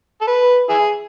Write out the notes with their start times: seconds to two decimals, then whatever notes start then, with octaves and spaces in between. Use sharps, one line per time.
0.21 A4
0.27 B4
0.69 E4 G#4